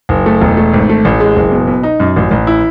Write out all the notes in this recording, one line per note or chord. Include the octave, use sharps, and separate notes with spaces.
F#1
A3
E1
A3
G#1
A3
A1
G#3
F#1
B2
B2
D#4
F#2
A1
A1
E4